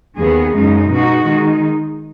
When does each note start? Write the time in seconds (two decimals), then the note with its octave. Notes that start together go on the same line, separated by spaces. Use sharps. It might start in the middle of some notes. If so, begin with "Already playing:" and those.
0.17 D#2 D#3 B3 G#4
0.54 F#2 C#3 G#3 D#4
0.90 B2 G#3 D#4 F#4
1.26 D#3 G#3 D#4